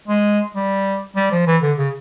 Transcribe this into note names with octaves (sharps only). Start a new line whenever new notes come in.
G#3
G3
G3
F3
E3
D3
C#3